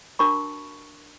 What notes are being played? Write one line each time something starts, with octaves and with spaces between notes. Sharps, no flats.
D4 F#4 A#4 A5 B5 C#6